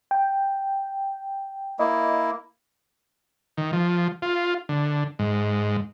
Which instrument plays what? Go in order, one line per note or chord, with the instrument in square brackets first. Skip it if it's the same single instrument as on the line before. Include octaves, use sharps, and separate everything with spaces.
[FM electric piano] G5
[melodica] A#3 E4 [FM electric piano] D#5
[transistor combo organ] D#3
F3
F4
D3
G#2